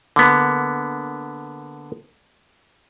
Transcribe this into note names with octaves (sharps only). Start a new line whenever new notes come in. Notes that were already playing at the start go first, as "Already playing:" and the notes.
D3 A#3 B3